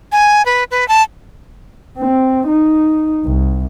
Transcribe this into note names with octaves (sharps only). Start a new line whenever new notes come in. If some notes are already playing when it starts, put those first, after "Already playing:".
G#5
B4
B4
A5
C4
D#4
C2